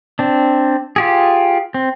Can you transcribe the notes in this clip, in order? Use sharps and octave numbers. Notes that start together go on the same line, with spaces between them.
C4 D4
F4 G4 G#4
C4